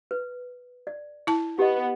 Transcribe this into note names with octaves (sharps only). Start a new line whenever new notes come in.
B4
D5
E4 A5
B3 G4 D#5